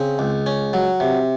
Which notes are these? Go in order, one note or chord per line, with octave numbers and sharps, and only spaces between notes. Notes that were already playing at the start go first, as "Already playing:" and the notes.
Already playing: C#3 C4
C#2
C#4
F#3
C3